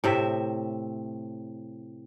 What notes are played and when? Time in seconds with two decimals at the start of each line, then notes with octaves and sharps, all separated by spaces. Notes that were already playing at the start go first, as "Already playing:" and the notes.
0.04 A2 C3 E5